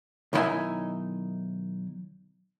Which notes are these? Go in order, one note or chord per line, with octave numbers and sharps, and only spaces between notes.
B1 D#3 E3 D#4 E4 G#5